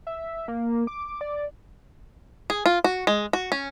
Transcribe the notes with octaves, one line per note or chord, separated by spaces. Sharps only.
E5
A#3
D6
D5
G#4
F4
F#4
G#3
F#4
C#4